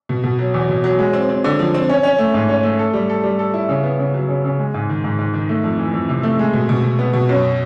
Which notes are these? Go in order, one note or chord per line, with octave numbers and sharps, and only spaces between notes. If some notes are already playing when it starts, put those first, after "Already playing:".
B2
B2
F#3
E2
B2
F#3
G#3
C4
C4
D3
F3
C4
C#4
C#4
A3
G#2
C#4
A3
A4
G3
A4
G3
A4
E4
C#3
B3
C#3
F#3
C#3
C#3
G#3
G#2
D#3
G#2
G#2
D#3
A3
F2
E3
F2
C3
A3
G#3
B2
B2
B2
B3
B2
F#2